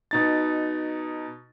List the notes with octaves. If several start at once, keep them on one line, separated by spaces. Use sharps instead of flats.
B2 D#4 A6